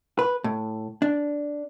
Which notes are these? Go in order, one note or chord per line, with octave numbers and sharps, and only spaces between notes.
B4
A2
D4